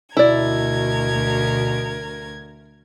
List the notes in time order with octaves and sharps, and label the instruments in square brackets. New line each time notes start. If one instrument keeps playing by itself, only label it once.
[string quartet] D2 A#4 G#6 [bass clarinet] B2 [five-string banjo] E4 D5